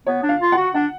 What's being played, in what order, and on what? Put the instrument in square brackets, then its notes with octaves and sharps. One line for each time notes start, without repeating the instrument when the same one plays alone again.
[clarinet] B3 [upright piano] C#5
[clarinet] D4
[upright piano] F5
[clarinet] F4
[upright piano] F#5
[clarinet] F#4
[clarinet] D4 [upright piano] F#5